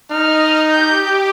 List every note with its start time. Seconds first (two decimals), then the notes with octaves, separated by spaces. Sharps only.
0.11 D#4 D#5 F6
0.71 G4 G6